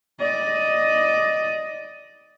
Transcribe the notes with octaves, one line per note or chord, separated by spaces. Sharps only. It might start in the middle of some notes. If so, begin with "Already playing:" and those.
D5 D#5